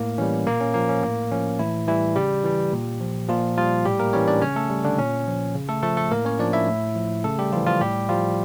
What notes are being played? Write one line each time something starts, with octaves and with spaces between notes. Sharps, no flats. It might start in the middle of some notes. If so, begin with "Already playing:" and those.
Already playing: A2 A#3
E3 G3 C#4
A#2 A#3
C#4
F3 A#3
C#4
A2 A#3
F3 C#4
A2 E3 E4
E3 G3 E4
C#3 G3 G4
E3 G3
A#2
F3
A#2 F3 F4
F3 G3 F4
A2 G3 G4
A#3 A#4
E3 G3 C#4 C#5
D4 D5
C#3 C#4 C#5
A3 A4
G3
D3 D4
A#2 C#4
F3
C#3
A3 A4
F3 A3 A4
A3 A4
A2 A#3 A#4
C#4 C#5
F3 D4 D5
E4 E5
A2
F3
C#3 A3 A4
G3 G4
E3 F3 G3 F4
F3 F4
A2 G3 G4
F3 G3 F4